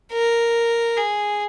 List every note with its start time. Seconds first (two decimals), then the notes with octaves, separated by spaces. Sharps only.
0.12 A#4
0.97 G#4